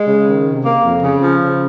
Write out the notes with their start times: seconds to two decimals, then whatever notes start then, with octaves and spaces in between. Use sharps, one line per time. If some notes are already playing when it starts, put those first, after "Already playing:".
Already playing: G#3
0.08 C#3
0.27 D#3
0.45 C3
0.65 A#3
0.84 F2
1.02 C#3
1.22 F3
1.40 C#3